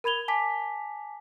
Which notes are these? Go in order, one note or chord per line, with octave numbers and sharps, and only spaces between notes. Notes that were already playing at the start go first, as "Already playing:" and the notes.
A#4 B5 G#6 F7 G7
G#5 A5 D6 B6